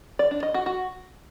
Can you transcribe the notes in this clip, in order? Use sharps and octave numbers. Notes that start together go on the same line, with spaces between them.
D5
D4
D#5
F#4
F#4